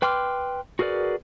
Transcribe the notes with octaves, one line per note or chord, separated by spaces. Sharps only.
B4 G5 C6 D6 F6
F#4 G#4 A#4 B4 D5